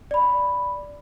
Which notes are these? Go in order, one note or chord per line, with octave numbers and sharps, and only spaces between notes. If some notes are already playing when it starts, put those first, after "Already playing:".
D5 B5